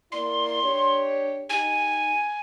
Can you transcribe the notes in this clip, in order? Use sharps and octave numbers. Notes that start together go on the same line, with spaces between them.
A#3 E4 D5 C6
D4 G4 C#5
D#4 G4 G#5